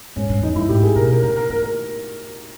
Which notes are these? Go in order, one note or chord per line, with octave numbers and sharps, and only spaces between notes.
G#2 C#4
G2
E2 D#4
G2 E4
G#2 G4
G#4
B2 A#4
A#4
C#3 A#4
A#4
D#3 A#4
A#4